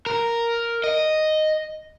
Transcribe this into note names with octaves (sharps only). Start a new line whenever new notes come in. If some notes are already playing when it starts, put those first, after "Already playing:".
A#4
D#5